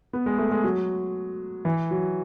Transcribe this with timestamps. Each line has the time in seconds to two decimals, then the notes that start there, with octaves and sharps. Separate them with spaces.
0.13 B3
0.26 G#3
0.38 A3
0.51 G#3
0.64 F#3
1.65 E3
1.91 F#3